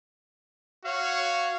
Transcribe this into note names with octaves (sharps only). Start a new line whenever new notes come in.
F#4 C#5 F5